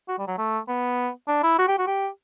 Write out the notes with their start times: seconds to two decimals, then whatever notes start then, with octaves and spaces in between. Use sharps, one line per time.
0.08 F#4
0.19 G3
0.28 F#3
0.38 A3
0.68 B3
1.28 D4
1.43 E4
1.58 F#4
1.68 G4
1.78 F#4
1.87 G4